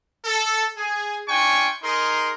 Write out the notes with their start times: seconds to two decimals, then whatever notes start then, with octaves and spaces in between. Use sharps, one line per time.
0.25 A4
0.78 G#4
1.27 D4 F4 G5 G#5 C#6
1.82 D#4 G#4 A#4 C6